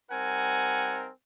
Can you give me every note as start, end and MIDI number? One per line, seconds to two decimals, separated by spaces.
0.11 1.09 55
0.11 1.09 60
0.11 1.09 63
0.11 1.09 70
0.11 1.09 78
0.11 1.09 80